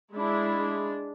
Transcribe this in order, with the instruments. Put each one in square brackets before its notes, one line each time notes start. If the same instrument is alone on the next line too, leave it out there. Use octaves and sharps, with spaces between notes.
[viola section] G#3 D4 E4